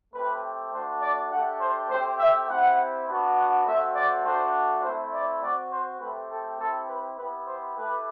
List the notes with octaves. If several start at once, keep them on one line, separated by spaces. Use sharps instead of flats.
A3 C4 G4 B4
A3 D4 F#4 C5
D5
A3 D4 G4 F#5
C5
A3 C4 G4 C5
E5
C4 E4 G4 F#5
B3 D4 F#4
F#5
A3 C4 F#4 E5
D5
A3 D4 F#4 C5
A3 C4 E4 C5
D5
C4 F#4 D5
C5
A3 C4 G4 B4
A4
C4 E4 G4 A4
B4
B3 E4 G4 B4
C5
A3 E4 G4 B4